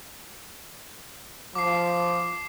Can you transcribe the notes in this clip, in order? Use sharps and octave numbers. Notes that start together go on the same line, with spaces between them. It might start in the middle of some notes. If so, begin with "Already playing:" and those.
F3 D6 C7